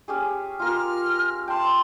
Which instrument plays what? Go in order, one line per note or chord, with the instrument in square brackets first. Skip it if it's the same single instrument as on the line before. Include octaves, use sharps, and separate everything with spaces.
[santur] C#4 G4 G#4
[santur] F4 A#4 [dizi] F6
[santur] G5 C6 [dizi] A5